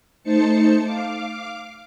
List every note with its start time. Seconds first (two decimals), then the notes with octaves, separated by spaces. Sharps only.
0.23 A3 D#4 C5 A5 C#7
0.83 F5 D6